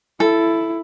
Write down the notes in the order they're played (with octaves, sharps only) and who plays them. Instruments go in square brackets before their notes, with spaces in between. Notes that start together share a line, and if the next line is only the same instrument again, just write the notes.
[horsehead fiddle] E4 [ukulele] A4